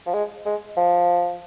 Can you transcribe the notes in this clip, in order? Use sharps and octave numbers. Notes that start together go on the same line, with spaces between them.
F3
G#3
G#3
F3